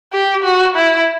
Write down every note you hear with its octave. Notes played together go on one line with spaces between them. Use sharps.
G4
F#4
E4